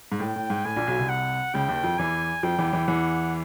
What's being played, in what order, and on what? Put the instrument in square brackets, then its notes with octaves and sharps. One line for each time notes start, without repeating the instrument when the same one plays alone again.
[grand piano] G#2
[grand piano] A2 [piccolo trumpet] G5
[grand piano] A2
G#2
[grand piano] A2 [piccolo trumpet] G#5
[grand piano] A#1 A#2
B1 B2
C2 C3
[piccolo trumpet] F#5
[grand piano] C#2 C#3 [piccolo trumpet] G5
[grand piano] D#2 D#3
F2 F3
[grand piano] E2 E3 [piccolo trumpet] G#5
[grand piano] F2 F3 [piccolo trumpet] G5
[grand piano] E2 E3
E2 E3
[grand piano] E2 E3 [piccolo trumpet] F#5